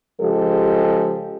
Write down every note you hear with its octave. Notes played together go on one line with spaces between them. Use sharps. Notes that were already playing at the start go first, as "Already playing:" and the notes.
C#3 F3 G#3 G4 A4